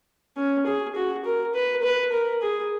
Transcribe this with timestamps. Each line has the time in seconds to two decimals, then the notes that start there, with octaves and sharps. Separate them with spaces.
0.37 C#4
0.66 G#4
0.95 F#4
1.25 A#4
1.54 B4
1.83 B4
2.12 A#4
2.42 G#4